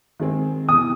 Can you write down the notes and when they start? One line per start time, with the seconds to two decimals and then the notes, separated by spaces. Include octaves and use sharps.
0.20 D#3 G#3 C4
0.68 E2 C3 E3 D#6